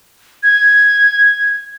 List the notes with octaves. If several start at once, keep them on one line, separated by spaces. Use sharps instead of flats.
G#6